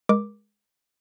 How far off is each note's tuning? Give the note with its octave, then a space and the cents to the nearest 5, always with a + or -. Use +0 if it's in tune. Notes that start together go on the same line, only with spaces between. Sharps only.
G#3 +0 A#4 +30 D6 +0